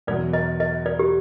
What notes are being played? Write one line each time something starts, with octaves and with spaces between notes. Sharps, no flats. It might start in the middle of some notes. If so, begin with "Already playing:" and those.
E2 B2 F#3 D5
D#5
D#5
D5
G4